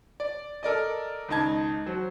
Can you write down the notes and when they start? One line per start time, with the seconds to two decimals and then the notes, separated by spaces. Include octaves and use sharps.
0.20 D5
0.63 A4 A#4 D5 D#5
1.28 C#2 D#3 D#4 A5 G#6
1.86 F#3 C5